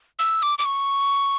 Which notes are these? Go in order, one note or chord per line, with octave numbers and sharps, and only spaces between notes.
E6
D6
D6
C#6